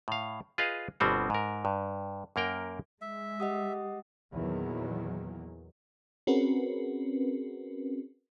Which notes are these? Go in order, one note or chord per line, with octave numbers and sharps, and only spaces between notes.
A2 F5
F4 G#4 B4 D#5 F5
G1 B2 G3 C4 F#4
G#2 A#4
G2
F#2 A#3 A#4 G5
G#3 E5
G4 D#5 F#5 D#6
E2 A#2 D#3 F#3
C4 C#4 F#4 G#4 A#4 B4